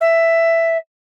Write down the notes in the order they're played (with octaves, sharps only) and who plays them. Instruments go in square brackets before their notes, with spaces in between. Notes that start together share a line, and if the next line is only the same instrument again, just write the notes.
[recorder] E5